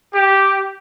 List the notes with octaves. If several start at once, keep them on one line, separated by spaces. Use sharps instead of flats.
G4